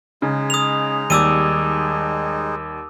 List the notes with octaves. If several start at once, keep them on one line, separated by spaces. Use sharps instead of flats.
C#3 G#3 D#4
D#6 F7
D#2 G3 D6 E6 D#7